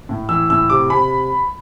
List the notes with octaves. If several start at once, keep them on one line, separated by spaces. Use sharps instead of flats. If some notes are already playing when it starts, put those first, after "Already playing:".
A2
E3 E6
A2 E6
C3 D6
C3 B5